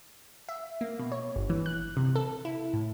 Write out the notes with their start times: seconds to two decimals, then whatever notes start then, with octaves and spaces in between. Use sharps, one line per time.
0.49 E5
0.81 A#3
0.99 B2
1.12 C#5
1.36 G1
1.50 E3
1.66 F#6
1.97 C3
2.16 A4
2.45 E4
2.73 A2